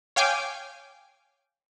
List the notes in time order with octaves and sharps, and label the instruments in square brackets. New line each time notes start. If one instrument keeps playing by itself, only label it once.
[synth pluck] C#5 F5 G5 G#5 D6